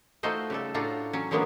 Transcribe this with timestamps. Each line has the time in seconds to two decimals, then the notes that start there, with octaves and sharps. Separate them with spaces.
0.23 A3 D#4 F4 F#4 C5 D#5
0.50 C#3 G3 A4
0.74 A2 D4 F4 F#4 A#5
1.13 F#3 C#4
1.31 D3 F#3 G#3 A#3 B3 C#4